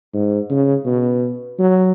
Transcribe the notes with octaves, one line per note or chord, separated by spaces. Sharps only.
G#2
C#3
B2
F#3